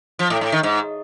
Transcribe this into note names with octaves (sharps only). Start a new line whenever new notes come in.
F3
A2
A2
D#3
G#2